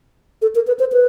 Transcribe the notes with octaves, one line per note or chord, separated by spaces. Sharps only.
A4
A#4
B4
C5
B4